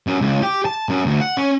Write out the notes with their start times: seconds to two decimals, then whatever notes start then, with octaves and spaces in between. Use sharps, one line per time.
0.07 F#2
0.21 C#2
0.42 G4
0.65 A5
0.89 F#2
1.06 D2
1.21 F#5
1.37 C#4